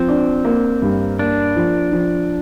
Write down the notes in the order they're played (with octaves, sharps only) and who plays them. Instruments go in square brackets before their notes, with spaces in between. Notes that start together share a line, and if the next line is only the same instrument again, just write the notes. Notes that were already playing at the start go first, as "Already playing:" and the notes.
Already playing: [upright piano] F3 [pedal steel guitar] C4
[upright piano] D4
A#3
G2
[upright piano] A#3 [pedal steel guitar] D4
[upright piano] F3
F3